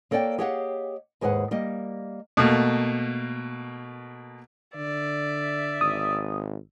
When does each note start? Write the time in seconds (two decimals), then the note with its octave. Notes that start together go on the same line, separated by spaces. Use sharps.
0.11 A#3 A4 C#5 D5 F5 G5
0.38 G4 G#4 C#5 D#5 F5 F#5
1.21 D#2 G#2 G#4 B4 F#5
1.51 G3 A#3 D#5
2.37 B2 A3 A#3
4.75 D3 D5 E5
5.81 G#1 D#6